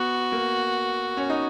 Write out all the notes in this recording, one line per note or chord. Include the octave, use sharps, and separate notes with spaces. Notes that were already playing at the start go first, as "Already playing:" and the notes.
Already playing: B3 F#4
A#3
C#4
D#4